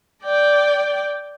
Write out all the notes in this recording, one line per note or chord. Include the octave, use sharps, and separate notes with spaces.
D5 G5